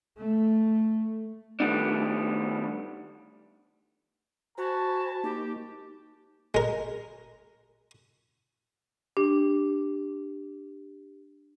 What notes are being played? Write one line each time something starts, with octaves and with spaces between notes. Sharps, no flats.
A3
D#3 G3 A3 B3 D4
F#4 C5 G#5 A5 B5
A#3 D#4 G4
G#3 A#4
D4 G4